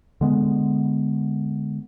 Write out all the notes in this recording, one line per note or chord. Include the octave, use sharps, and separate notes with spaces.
D3 G#3 B3